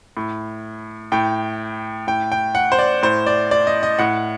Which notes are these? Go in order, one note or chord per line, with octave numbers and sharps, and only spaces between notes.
A2
A2 G5
A2 G5
G5
F#5
C5
D5
A2 C5
D5
D5
D#5
D#5
A2 F#5